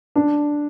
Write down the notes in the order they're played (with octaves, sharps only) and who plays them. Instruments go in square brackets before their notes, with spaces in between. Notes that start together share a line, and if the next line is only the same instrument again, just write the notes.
[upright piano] D4